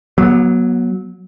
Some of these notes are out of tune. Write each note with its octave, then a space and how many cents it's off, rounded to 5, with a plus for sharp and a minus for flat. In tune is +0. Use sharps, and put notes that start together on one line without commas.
F#3 +0 B3 -40